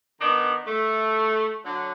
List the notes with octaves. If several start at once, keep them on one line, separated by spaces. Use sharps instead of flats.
D#3 B3 D4 D#4
A3
D3 F#3